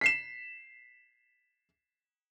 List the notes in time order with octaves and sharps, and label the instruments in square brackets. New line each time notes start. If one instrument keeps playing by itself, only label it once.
[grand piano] B6 C7 E7